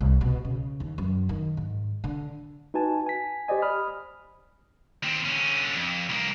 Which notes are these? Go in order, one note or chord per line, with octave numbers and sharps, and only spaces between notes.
C2
B2
C#3
D#2
F#2
D#3
G#2
D3
D#4 F#4 B4 G#5 A5
G#5 B6
G4 C5 D5 D#5 G#5
B5 D#6 F6
D#2 C4
D3 C#4
F2
C2 A#3